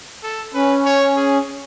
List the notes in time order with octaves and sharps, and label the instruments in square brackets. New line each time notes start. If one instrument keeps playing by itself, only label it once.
[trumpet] A4
[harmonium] C#4 [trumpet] B4
[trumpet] C#5
G#4